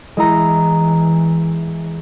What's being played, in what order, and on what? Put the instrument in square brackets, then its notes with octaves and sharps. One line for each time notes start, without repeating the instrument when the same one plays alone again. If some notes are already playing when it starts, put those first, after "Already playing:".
[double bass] E3 [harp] G#3 E4 A#5